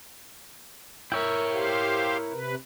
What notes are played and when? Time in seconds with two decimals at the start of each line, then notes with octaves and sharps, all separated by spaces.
1.12 E4 A#4 C#5 E5 G5
1.52 G4 C5 F5
2.32 C3 B4